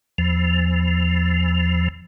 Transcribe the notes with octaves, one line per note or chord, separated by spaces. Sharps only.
E2 F3